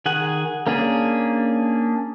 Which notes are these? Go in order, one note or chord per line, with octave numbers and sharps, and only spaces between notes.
D#3 G#4 F#5
A#3 C#4 D4 G#4